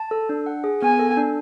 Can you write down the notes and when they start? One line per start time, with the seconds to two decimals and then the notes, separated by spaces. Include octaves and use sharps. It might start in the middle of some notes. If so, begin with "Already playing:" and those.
Already playing: A5
0.11 A4
0.29 D4
0.46 F#5
0.64 G#4
0.82 B3 G#5
1.00 A4
1.17 D4